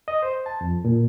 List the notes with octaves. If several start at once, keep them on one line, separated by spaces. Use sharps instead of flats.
D#5
C5
A5
F2
A#2